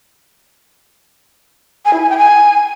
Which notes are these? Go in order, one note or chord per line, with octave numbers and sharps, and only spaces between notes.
G#5
E4
G#5
G5
G#5